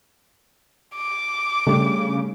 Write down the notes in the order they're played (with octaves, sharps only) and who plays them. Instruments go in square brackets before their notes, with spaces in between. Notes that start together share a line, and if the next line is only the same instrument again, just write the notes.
[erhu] D6
[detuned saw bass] C#3 [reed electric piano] G3 A3 D4